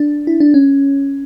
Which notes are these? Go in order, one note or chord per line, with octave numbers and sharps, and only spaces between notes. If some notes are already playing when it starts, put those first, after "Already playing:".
Already playing: D4
E4
D4
C#4